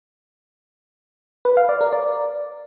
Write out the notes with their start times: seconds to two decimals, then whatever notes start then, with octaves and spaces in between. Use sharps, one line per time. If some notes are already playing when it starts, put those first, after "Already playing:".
1.45 B4
1.57 F5
1.69 D5
1.81 A#4
1.93 D5